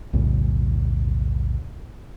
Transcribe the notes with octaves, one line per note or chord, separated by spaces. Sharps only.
B1 E2 A2 C#3